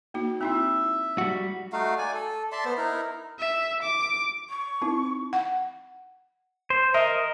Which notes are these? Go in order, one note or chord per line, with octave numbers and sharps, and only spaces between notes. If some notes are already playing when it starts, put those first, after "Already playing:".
A#3 D#4 F#4
C4 D#4 E4 E5
G3 F#4
A3 D#4 F#4 F5
D5 G#5
A4
D5 E5 A5 C6
B3 C5
D#4 E4 A#4
E5
D6
C#6
C4 D#4 E4
F#5
C5
A#4 D#5 E5